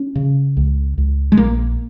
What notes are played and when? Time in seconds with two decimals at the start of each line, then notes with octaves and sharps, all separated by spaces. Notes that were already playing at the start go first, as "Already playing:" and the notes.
Already playing: C#4
0.16 C#3
0.57 C#2
0.98 C#2
1.32 G#3
1.37 A#1 A#3